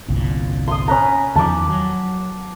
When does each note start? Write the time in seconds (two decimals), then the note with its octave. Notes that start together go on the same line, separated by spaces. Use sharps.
0.08 G1 C2 A#2
0.68 C6 D#6
0.88 C#4 B4 A#5
1.35 E2 D#3 F3 A5 D6
1.69 F#3